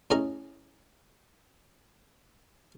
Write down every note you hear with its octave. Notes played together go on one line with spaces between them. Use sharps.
A2 C#4 G#4 D#5 A#5